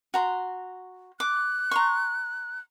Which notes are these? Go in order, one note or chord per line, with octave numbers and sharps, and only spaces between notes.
F#4 A#5 C6
D6 F#6
A#5 C6 C#6